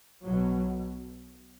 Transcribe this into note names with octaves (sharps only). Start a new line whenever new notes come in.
B1 B2 F#3